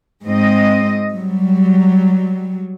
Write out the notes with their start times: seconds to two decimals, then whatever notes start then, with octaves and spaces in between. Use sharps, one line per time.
0.25 G#2 C4 D#5
1.14 F#3 G3